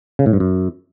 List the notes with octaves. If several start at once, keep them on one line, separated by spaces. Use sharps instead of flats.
C#3
A2
G2
F#2